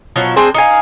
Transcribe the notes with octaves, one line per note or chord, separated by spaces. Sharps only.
B2 F3 F#3
C4 D4 G#4 C5
D#4 F5 G#5